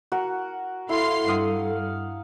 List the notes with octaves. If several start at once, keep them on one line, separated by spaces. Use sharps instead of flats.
F#4 A#4 F#5
E4 A4 F5 C6 C7
G2 F5 F#5 D#6